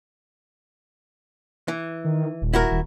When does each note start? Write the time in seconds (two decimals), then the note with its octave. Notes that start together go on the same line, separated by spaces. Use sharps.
1.68 E3
2.04 D#3
2.42 D#1
2.53 E4 F#4 A#4
2.71 D#1